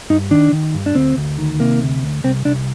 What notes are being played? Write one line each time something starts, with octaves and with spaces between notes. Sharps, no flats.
G2 D#4
D#3 D4
D#3
G2
D4
D2 C4
D2
D#3
C3 A#3
D2
D2
C2 C4
C2 D4